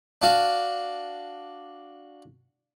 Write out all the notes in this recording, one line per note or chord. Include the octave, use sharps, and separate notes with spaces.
D4 F#4 F5